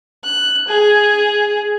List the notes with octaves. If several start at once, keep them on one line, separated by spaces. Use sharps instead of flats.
F#6
G#4